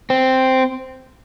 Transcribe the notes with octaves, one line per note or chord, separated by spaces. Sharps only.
C4